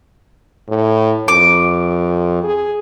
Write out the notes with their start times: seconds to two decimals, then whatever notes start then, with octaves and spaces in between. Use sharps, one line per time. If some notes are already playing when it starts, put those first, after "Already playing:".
0.68 A2
1.28 F2 D6
2.43 G#4